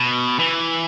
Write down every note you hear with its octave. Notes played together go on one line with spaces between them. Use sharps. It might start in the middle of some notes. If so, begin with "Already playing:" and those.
Already playing: B2
E3